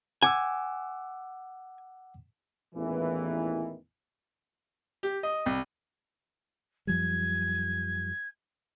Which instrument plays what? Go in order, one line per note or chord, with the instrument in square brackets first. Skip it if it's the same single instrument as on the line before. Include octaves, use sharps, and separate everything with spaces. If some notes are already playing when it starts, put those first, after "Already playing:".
[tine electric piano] F#5 D6 E6 [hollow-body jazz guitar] G#5
[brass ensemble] A1 E2 A#2 D#3 E3
[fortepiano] G4
D#5
C2
[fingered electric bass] F#2 F3 G3 [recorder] G#6